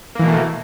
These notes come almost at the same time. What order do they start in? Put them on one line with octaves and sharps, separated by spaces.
A#3 E3 B2 A3